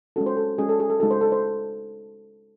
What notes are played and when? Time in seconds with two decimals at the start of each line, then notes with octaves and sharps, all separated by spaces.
0.16 G#3 C#4 F#4 A4
0.26 C5
0.37 A4
0.58 G#3 C#4 F#4 G#4
0.69 A4
0.80 G#4
0.90 A4
1.00 G#3 D#4 F#4 A4
1.11 C5
1.21 A4
1.32 C5